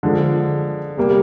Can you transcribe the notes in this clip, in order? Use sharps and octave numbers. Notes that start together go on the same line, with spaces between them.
D3 F3 G#3
C3 G3 A#3